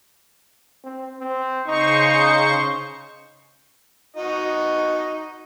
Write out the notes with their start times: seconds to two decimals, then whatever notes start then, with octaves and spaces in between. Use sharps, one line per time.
0.84 C4
1.20 C4
1.67 C#3 D#4 C5 C#6
4.17 D#4 F#4 D#5